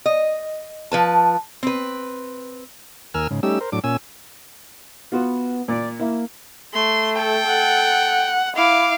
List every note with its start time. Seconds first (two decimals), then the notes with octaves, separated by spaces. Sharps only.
0.06 D#5
0.92 F3 B4 A5
1.63 C4 B4
3.14 D#2 A#4 G#5 E6 F6
3.31 G#2 C#3
3.43 G3 A3 C#4 D#4 G4 E6
3.61 A#4 C5
3.72 A2 F#3 D4 D6
3.84 A#2 C#4 G#5 E6
5.12 B3 F4 F#4
5.68 A#2 D5
6.00 A#3 E4
6.74 A3 C6
7.17 A4 G5
7.47 F#5
8.56 E4 F5 D6